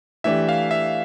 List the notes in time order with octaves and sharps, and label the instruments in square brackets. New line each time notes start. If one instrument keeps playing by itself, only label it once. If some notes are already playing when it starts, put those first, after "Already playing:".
[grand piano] E3 A3 D4 G4 [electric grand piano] E5
[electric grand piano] F5
E5